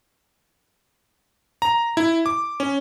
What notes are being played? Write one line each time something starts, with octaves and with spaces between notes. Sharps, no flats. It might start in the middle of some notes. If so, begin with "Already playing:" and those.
A#5
E4
D6
C#4